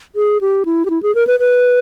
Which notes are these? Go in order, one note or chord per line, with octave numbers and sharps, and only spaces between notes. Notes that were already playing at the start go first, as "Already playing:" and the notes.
G#4
G4
E4
G4
E4
G#4
A#4
B4
B4